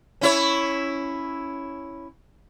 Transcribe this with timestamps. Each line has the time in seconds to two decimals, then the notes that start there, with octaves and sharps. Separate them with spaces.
0.21 C#4 E4 C#5